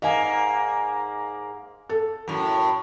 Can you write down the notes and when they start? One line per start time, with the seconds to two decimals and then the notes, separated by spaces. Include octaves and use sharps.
0.02 G#2 A#3 D#5 F5 G#5
1.89 A4
2.28 F#2 A2